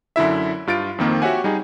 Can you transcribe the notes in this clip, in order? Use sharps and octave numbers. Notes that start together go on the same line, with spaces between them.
F#2 D3 E4 E5
G2 F4 A6 D7
F2 D#3 A#3 C4
F#4 G4 C#5 E5 F#5 G#5
G3 D#4 G#4